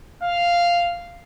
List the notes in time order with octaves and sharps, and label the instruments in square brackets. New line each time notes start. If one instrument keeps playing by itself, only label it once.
[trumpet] F5